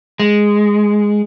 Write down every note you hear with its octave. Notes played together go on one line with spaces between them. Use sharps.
G#3